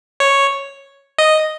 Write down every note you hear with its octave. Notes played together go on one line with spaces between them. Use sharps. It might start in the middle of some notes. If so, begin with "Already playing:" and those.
C#5
D#5